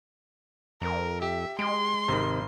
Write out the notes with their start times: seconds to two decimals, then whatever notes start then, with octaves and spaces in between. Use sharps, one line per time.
0.82 F2 A#4
1.22 G4 E5
1.59 G#3 C6 D7
2.08 G#1 C3 D#3